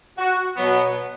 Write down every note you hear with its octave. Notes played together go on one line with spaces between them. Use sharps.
F#4
B2 F#3 B3